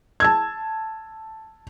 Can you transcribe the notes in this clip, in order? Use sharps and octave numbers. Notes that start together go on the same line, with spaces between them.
A5 E6 G#6